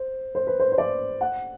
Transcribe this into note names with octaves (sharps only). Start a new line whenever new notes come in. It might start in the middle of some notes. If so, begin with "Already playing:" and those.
Already playing: C5
C5
B4
C5
C5
D5
F#5